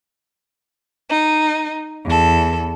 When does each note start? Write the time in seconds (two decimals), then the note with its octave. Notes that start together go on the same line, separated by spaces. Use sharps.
1.10 D#4
2.05 E2 A4